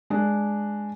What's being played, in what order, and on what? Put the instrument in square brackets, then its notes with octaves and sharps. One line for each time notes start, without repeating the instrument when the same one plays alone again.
[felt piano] G#3 D4